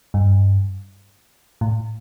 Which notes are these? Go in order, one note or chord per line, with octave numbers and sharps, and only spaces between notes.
G2
A2